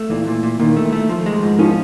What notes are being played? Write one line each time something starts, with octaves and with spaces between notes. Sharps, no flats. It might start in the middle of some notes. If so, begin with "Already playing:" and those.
Already playing: A3
A#2 E3
A#2
A#2
A#2 D#3
A3
A3
F3
G#3
G#2
F3 C#4